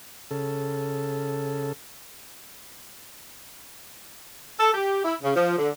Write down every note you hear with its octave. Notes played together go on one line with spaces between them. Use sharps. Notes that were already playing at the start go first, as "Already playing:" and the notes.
C#3 A4
A4
G4
E4
C#3
F3
D3